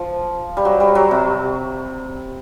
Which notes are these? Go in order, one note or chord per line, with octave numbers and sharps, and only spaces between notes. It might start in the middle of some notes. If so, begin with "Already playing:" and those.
Already playing: F3
G3
F#3
G3
F#3
C3